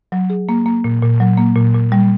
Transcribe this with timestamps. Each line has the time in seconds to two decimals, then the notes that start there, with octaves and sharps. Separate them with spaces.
0.12 F#3
0.30 G#4
0.49 A#3
0.66 A#3
0.84 A#2
1.02 A#2
1.20 F#3
1.38 A#3
1.56 A#2
1.75 A#2
1.92 G3